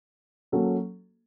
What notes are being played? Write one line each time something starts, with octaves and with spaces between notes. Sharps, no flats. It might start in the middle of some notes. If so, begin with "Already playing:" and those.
F#3 A#3 C#4 F#4 A4